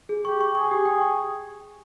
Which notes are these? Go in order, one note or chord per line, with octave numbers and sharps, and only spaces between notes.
G#4
G4 C#6
C#6
G#4 C#6
G4
G5
C#6